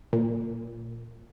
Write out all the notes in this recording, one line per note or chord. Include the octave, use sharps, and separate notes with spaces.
A#2